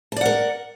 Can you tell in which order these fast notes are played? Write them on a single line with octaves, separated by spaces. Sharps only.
A5 D5 F#5 A#4